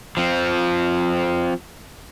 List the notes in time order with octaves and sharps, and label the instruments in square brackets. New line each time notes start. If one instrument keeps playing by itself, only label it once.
[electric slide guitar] F3 C4